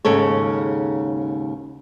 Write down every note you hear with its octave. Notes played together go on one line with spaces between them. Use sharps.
D#2 G#2 C#3 A4 C#5